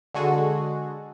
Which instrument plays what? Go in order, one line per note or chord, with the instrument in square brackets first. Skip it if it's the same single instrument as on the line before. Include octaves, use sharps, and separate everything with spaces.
[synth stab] D3 G#3 F#4 G#4 A4